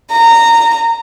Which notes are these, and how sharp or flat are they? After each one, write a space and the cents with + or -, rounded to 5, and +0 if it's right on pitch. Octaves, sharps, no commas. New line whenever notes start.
A#5 -15